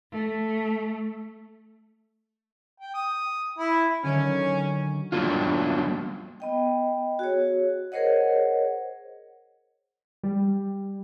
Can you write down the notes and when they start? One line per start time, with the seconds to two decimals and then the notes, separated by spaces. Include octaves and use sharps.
0.11 A3
2.80 G5
2.94 D#6
3.58 E4
4.03 D3 D#3 F#3 C#4
5.12 F#3 G3 A#3 B3 D4 F4
6.40 B3 D#5 G5
7.19 F#4 G#4 C#5
7.92 G#4 A#4 C5 C#5 D#5 F#5
10.23 G3